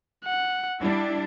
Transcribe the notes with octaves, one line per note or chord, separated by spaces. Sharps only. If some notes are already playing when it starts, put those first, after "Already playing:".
F#5
G3 D4 E4